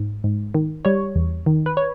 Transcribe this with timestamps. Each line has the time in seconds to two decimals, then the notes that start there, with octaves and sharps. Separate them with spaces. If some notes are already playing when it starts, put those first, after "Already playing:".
Already playing: G#2
0.24 G#2
0.54 D#3
0.85 G3 C#5
1.15 E2
1.46 D#3
1.66 B4
1.77 C#5